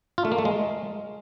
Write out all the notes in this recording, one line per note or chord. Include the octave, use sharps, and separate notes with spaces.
F4
A3
A#3
A3
G#3